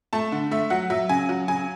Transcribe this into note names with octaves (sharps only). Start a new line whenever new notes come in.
A3 A5
D3
A3 E5
F#3 F#5
F#3 E5
C#3 G#5
F#3
C#3 G#5